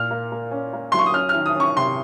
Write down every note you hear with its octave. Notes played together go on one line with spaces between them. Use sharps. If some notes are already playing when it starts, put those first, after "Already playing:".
Already playing: A#2 F6
A#3
A#3
C#4
A#3
F#3 C6
C#6
D#6
C#4 F6
F6
D#3
D#6
C#4 C#6
C3 C6